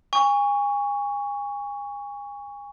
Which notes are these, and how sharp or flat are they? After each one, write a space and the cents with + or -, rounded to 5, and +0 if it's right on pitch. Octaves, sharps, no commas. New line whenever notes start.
G#5 -30 C#6 +15